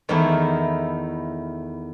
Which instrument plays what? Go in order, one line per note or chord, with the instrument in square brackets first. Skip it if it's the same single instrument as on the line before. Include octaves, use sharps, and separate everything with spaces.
[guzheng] E2 D#3 A3 E4